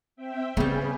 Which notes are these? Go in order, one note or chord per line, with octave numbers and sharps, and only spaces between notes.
C4 E5 G5
C#3 G3 B3 G#4 B4